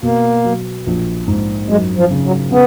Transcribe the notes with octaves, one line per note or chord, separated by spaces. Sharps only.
B2 A#3
F#3
A#1
G#2
F#2 G#3
F3
C#3
F#3
C#3 B3